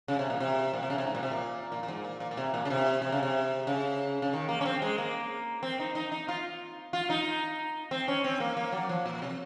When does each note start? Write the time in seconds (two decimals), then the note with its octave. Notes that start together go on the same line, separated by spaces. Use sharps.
0.08 C#3
0.19 C3
0.30 A#2
0.40 C3
0.74 A#2
0.83 C3
0.90 C#3
0.98 C3
1.07 G#2
1.15 A#2
1.23 C3
1.31 A#2
1.72 A#2
1.83 A#2
1.88 G#2
2.05 A#2
2.20 A#2
2.31 A#2
2.37 C3
2.54 A#2
2.65 C#3
2.70 C3
3.02 C3
3.12 C#3
3.23 C3
3.67 C#3
4.22 C#3
4.33 D#3
4.49 A#3
4.61 C#4
4.65 C4
4.82 G#3
4.98 A#3
5.63 C4
5.79 D#4
5.95 D#4
6.12 D#4
6.28 F4
6.93 F4
7.10 D#4
7.91 C4
8.08 C#4
8.24 C4
8.40 A#3
8.57 A#3
8.72 F#3
8.89 F3
9.06 A#2
9.22 C3